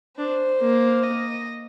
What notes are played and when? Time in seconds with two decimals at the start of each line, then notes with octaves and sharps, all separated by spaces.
0.18 D4 C5
0.61 A#3
1.03 D#5